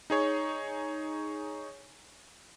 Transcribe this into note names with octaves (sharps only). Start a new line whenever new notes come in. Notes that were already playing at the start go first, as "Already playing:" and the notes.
D#4 G#4 C#5